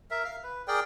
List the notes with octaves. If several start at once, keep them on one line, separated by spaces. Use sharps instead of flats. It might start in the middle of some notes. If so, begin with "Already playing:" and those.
A#4 E5
F5
B4
G#4 A#4 D5 G5